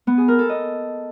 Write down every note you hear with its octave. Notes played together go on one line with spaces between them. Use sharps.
B3
G#4
A#4
A4
D#5